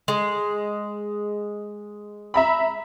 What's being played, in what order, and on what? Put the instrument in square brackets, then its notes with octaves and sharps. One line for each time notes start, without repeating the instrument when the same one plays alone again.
[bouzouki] G#3
[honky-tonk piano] E5 A#5 B5